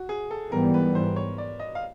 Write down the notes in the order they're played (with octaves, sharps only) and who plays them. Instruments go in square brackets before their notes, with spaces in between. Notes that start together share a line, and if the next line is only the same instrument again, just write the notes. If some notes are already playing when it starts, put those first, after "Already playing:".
Already playing: [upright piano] F#4
G#4
A4
[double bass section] G#2 E3 G3 B3 [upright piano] A#4
[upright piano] B4
C5
C#5
D5
D#5
F5